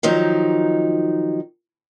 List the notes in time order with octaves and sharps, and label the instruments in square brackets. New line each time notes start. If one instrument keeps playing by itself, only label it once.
[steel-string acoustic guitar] D#3 F3 F#3 D#4